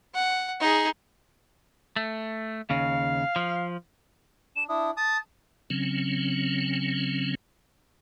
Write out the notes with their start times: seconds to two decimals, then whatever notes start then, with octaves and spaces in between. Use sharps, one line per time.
0.15 F#5
0.60 D#4 G#4
1.96 A3
2.70 D#2 C#3 F5
3.36 F3
4.56 D4 E7
4.69 D4 E4 D#6
4.97 A5 D#6 A6
5.70 C#3 F#3 C4 C#4